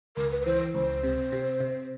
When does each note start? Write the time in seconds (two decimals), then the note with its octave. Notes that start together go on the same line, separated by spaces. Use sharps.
0.17 C#2 A#4
0.31 B4
0.41 B4
0.46 E3 C5
0.75 C#2 C5
1.03 C3
1.32 C3
1.60 C3